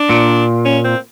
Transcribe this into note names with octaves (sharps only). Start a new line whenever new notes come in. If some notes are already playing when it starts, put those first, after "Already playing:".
Already playing: D4
A#2
C#4
C4